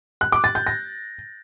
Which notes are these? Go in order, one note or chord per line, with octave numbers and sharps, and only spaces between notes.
F#6
D6
A6
G6
A#6